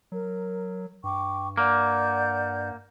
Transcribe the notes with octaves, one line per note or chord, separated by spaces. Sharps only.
F#3 A#4
G2 G5 C#6 D6
A#3 D5 F#5 G6